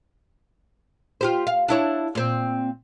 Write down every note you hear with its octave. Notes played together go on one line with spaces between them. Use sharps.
F4 G4 C5
F5
D4 E4 C#5
A#2 C4